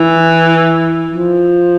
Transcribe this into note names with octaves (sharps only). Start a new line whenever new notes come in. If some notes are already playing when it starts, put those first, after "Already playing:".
Already playing: E3
F3